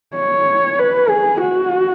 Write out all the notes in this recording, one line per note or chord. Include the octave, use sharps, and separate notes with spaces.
C#5
B4
G#4
F#4